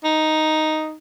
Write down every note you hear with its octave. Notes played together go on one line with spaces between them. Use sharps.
D#4